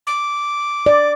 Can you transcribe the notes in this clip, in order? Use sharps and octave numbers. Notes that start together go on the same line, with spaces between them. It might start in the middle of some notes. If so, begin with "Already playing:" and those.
D6
D5